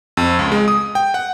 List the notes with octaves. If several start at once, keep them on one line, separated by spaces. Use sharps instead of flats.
F2
C#2
G#3
D#6
G5
F#5